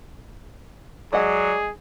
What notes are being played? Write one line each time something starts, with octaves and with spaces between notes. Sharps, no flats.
F#3 G#3 G#4 D5 D#5 F#5